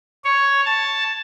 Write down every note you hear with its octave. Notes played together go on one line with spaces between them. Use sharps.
C#5
A5